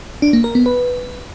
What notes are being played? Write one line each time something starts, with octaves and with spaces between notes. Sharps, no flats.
D4
A#3
A#4
B3
B4